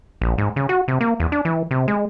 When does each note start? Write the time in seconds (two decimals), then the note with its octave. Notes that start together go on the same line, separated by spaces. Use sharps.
0.21 A#1
0.38 G#2
0.56 C#3
0.69 F#4
0.88 C3
1.01 A#3
1.20 E2
1.32 D4
1.45 E3
1.71 C3
1.88 G#3